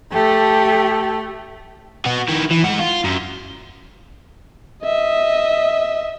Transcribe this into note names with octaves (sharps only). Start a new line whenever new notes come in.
A3 G4 A4
B3 F#4
D#3 E4
E3
G#2 F#5
F4
F#2
D#5 E5